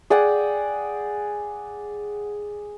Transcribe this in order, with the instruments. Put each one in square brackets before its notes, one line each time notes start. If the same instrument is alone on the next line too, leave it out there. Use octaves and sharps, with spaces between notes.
[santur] G#4 D5 F#5 G5